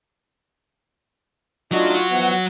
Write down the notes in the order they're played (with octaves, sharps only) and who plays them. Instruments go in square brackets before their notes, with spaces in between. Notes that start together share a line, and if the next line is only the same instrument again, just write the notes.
[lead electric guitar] F#3 F#4 [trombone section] A3 D4 D#4 [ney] F4
[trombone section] E3 F3 B3 [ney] F#5